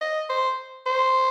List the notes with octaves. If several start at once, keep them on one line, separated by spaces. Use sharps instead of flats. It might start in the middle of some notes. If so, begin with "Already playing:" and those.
D#5
C5
C5